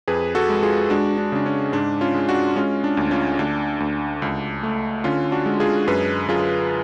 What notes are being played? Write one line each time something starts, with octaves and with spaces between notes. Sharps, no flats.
F2 G#4 B4
F#4 A4
G#3
F4 G#4
G#3 D4 F#4
D4
C#3 D4
C#4
G#2 D4
C#4 F4
G#3
D4 F#4
G#3 C#4 F4
D4
D2
C#4 F4
D2 D4
D2
C#2
A3
D3 C#4 F4
D4 F#4
G#3
F4 G#4
F#2 G#4 B4
F#2 F4 G#4